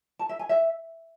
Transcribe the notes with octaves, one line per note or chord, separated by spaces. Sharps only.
A5
E5
G#5
E5